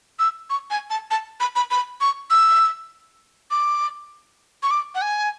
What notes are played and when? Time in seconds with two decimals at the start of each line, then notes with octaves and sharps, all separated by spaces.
0.19 E6
0.50 C#6
0.70 G#5
0.90 A5
1.11 A5
1.40 B5
1.56 B5
1.71 B5
2.01 C#6
2.31 E6
3.51 D6
4.63 C#6
4.71 D6
4.95 F#5
5.02 G#5